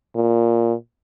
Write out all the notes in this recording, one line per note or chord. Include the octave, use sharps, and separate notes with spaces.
A#2